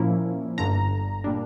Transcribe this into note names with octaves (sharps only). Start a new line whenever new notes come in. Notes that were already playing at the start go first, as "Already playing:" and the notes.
Already playing: A#2 F3 A#3 C#4 E4
G1 G2 D3 A#5
A#2 G3 D4